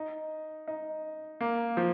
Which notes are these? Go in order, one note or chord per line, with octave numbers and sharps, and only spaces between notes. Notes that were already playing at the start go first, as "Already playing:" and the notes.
Already playing: D#4
D#4
A#3
F3